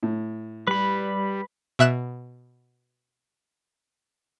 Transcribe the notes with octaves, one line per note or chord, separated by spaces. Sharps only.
A2
G3 B4 B5
B2 E5 F#6 E7